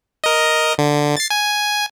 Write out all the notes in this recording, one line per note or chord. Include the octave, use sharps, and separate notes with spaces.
A#4 D#5
D3
A6 C7
G#5